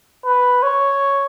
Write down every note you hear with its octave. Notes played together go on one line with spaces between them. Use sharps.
B4
C#5